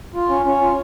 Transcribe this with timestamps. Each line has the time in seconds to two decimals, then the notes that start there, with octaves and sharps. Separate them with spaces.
0.14 F4
0.29 C#4
0.45 C#4
0.61 F4